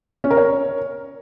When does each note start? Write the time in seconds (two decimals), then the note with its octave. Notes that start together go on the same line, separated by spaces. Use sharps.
0.24 C#4
0.30 A#4
0.37 C#5